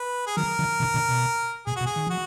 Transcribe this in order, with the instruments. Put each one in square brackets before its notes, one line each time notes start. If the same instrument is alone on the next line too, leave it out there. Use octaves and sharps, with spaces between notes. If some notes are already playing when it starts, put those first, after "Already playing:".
Already playing: [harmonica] B4
G#4
[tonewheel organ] D#3 F#3 [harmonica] A#4
[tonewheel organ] D3 F3
B2 D#3
A#2 D3
B2
[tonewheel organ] A#2 [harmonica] G#4
[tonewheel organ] B2 [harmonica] F#4
[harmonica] G#4
[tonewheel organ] D#3
[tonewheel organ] F3 [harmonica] F#4